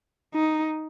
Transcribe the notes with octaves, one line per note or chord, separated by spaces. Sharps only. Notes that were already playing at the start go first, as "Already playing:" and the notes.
D#4